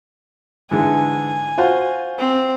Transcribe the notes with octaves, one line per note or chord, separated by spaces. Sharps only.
G#2 D3 E3 G#5
F4 F#4 C5
C4